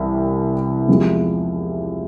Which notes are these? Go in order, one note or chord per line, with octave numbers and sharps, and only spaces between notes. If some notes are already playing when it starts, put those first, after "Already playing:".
Already playing: C2 C3 E3 G3
E2 C3 F3 G#3